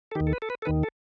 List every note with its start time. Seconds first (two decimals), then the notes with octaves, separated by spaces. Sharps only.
0.11 A4
0.15 D#2 D#3 G4
0.27 A4
0.33 B4
0.42 A4
0.50 B4
0.62 A4
0.65 D#2 D#3 B4
0.83 A4